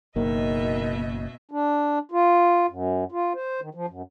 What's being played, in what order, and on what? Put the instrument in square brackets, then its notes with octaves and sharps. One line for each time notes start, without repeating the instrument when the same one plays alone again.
[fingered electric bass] F#1 [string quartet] B2 D#5 E5 [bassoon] D#3 [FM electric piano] A#3
[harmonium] D4
F4
F#2
F4
C5
D#3
F3
F#2